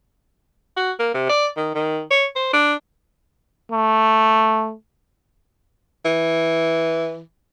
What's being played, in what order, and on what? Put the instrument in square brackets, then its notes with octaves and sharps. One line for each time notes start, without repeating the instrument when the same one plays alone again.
[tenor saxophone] F#4
A#3
C3
D5
D#3
D#3
C#5
C5
D4
[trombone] A3
[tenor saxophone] E3